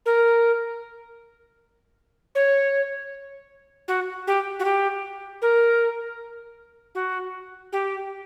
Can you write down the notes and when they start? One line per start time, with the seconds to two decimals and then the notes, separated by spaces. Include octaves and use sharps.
0.06 A#4
2.35 C#5
3.88 F#4
4.27 G4
4.59 F#4
4.65 G4
5.42 A#4
6.95 F#4
7.72 G4